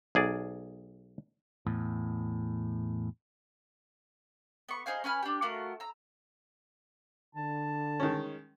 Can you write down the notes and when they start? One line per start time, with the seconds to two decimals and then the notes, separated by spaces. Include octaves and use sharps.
0.15 B1 G#4 D5
1.66 E2 A2
4.69 B3 C#6
4.86 D#4 G#4 C5 F5
5.04 C#4 B4 G#5 F6
5.23 D4 G4
5.42 A3 F4 F#4 A#4
5.80 A#5 E6
7.35 D3 A5
8.00 D#3 G#3 C#4